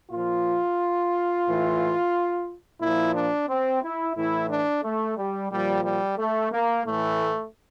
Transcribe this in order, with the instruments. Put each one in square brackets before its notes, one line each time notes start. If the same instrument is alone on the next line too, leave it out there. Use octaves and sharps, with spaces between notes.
[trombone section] A#2 F3 F4
A2 E3
A#2 F3 E4
D4
C4
E4
A2 E3 E4
D4
A3
G3
A#2 F3 G3
G3
A3
A#3
A2 E3 A3